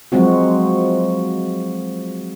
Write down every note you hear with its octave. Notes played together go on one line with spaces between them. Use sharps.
F3 F#3 G#3 C4 F#4